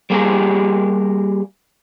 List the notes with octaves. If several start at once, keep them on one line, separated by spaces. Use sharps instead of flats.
G3 A#3 G4 G#4 A#4